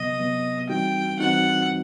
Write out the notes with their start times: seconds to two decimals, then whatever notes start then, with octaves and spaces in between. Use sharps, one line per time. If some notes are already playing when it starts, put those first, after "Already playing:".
Already playing: C3 F#3 B3 D#5
0.19 C3 F#3 B3
0.69 E3 G3 C4 D#4 F#4 G5
1.19 E3 G3 C4 D#4 F#4 F#5